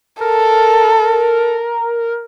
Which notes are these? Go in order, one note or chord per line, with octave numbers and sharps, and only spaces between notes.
A4 A#4